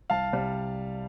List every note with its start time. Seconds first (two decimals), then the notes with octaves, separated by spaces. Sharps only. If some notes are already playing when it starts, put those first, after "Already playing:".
0.10 C2 F5 A5
0.33 C3 G3